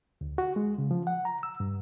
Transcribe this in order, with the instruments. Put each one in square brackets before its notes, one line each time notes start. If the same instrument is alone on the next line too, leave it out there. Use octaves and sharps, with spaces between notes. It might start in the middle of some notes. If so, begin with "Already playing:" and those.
[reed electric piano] D2
F#4
G#3
C#3
F3
F#5
A#5
E6
G2